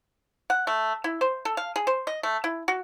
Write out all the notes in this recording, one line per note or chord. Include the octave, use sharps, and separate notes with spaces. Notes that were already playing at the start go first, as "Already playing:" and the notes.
F#5
A3
E4
C5
A4
F5
G#4
C5
D#5
A3
E4
F#4